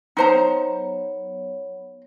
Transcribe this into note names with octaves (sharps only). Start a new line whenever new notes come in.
F#3 B3 D#4 C5 C#5 A#5